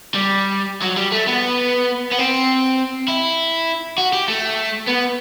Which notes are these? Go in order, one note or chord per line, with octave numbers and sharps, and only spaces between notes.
G3
F#3
G3
A3
B3
B3
C4
E4
F#4
G4
A3
B3